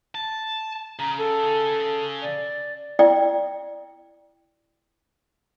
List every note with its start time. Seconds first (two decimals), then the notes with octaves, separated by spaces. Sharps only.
0.15 A5
0.99 C#3 A#5
1.18 A4
2.22 D5
2.99 E4 D5 G5